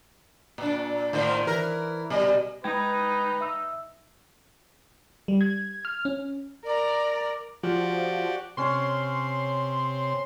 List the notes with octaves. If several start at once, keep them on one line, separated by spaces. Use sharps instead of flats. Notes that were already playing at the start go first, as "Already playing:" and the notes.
A#2 D4
A2 D#3 C5
E3 A#4
B2 G3 D#5
G#3 D#4 B4 G5 G#6
E5 E6
G3
G#6
F6
C#4
A#4 D5 A#5
F3 F#4 G4 D5
C3 C#4 C#5 C6